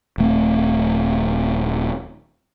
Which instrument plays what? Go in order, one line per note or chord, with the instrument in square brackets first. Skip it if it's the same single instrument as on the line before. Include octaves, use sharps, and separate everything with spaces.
[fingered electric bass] D#1 A3 C4